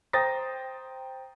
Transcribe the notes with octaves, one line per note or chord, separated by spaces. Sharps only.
C5 G5 A#5 D#6 A6 A#6